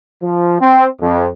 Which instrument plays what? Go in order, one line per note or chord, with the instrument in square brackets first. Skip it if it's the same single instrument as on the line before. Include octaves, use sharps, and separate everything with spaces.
[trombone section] F3
C4
F2